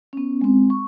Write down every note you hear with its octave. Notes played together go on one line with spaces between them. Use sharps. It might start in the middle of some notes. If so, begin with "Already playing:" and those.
B3 C#4
G#3 C4
C#6